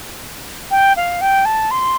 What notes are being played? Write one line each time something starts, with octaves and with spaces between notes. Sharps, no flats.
G5
F5
G5
A5
C6